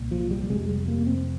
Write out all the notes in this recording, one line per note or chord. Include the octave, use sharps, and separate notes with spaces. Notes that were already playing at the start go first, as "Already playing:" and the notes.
Already playing: C2 A#2
F3
G3
F1 F2 C3 G#3
G3
A#3
C4